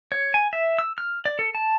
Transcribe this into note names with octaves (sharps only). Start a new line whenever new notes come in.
C#5
G#5
E5
E6
F6
D5
A4
A5